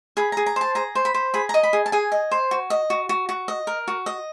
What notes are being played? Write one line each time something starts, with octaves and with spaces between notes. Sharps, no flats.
G#4 B5
G#4 A#5
A#5
C5 A5
G#4 A#5
C5
B5
C5
G#4 B5
D#5 A#5
B5
G#4
A5
G#4 G#5
D#5
C5
F#4
D#5
F#4
F#4
F#4
D#5
A#4
F#4
D#5